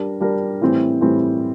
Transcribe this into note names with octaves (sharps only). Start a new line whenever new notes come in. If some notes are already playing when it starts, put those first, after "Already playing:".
Already playing: G3 D4 G4 A#4
G3 D4 G4 A#4
A2 E3 G3 C4
A2 E3 G3 C4